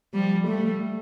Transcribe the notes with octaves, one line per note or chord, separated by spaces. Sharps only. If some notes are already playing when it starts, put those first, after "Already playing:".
F3 G3
G3 A3